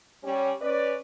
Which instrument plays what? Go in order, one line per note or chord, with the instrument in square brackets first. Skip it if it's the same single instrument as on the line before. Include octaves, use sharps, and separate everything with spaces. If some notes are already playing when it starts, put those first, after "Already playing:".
[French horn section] G3 C#4
C#4 B4 D5